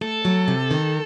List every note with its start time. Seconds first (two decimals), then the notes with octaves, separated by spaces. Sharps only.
0.01 A3 A4
0.25 F#3
0.48 C3
0.71 D#3